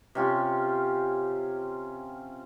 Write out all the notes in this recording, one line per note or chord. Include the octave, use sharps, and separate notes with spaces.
C3 C#4 F4 G4